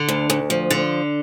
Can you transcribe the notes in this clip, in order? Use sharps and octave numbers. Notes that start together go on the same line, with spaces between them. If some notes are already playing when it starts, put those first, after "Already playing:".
Already playing: D3
D2
D2
F3
D3